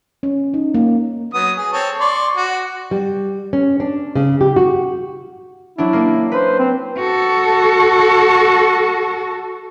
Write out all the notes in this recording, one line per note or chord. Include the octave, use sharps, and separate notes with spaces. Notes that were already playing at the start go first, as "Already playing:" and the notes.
C#4
D#4
A#3
F#3 B3 D#6
G#4
C4 A4 C#5
D5 C6 C#6
F#4
G3
C#4
D4
C#3
G4
F#4
F#3 D4 E4
A#3 D4
B4 C5
C4
F#4 A4